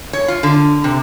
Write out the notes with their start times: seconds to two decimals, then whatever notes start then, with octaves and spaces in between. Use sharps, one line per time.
0.13 C#5
0.28 F4
0.43 D3
0.84 C3